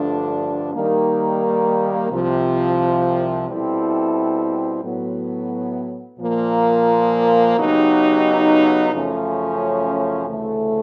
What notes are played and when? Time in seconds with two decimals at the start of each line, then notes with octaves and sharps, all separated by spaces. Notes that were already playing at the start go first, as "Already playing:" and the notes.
Already playing: G2 D3 F3 A3 D4
0.74 D#3 G3 A#3
2.11 C2 C3 F3
3.47 B2 G3 C4 E4 A4
4.84 A2 F#3 B3
6.19 A#2 F3 A#3
7.56 C#3 F#3 B3 D#4 G4
8.93 F#2 C#3 F3 A3 C#4
10.28 D2 C#3 E3 A3